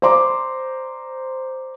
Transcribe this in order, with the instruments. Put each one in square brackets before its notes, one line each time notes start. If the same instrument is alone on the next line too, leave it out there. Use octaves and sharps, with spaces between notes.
[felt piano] C5 D5 A#5 C6 D6